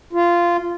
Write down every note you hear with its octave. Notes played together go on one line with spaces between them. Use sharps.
F4